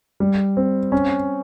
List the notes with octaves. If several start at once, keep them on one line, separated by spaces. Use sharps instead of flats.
G3
C4
C#4